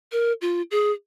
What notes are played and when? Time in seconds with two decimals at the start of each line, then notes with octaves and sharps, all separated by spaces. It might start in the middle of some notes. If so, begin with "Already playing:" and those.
0.12 A#4
0.42 F4
0.71 G#4